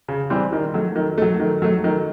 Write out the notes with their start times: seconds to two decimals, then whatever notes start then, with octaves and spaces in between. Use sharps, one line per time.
0.08 C#3
0.30 E3 G3 C4
0.53 D#3
0.74 F#3 A3
0.96 D#3
1.18 F#3 A3
1.40 D#3
1.62 F#3 A3
1.84 D#3